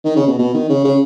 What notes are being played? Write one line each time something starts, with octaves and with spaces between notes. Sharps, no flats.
D#3
C#3
B2
B2
D#3
C#3
C#3